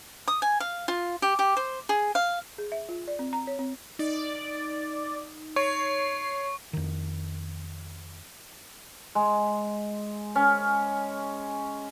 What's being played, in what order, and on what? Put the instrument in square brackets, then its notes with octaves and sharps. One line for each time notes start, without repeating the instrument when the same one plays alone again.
[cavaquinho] D#6
G#5
F5
F4
G4
G4
C5
G#4
F5
[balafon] G#4
E5
F4
D5
C4
A#5
C#5
C4
[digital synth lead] D#4 [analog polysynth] D5
[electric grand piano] C#5 [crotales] C#6 [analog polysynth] C7
[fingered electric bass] F2 D#3
[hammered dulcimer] G#3
C#4